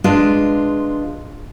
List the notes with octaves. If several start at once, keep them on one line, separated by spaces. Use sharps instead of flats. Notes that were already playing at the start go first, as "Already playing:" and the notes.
G#3 D4 F4 G#4 B4 F5